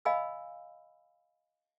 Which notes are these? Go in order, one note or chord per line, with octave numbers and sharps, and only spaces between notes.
D#5 F5 G#5 B5 E6